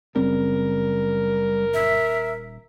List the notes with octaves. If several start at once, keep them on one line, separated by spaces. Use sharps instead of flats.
F#1 C#3 G3 C4 A#4
D#1 E5